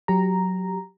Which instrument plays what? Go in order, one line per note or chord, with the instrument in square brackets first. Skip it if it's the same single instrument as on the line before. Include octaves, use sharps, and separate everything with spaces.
[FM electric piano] F#3 G4 A#5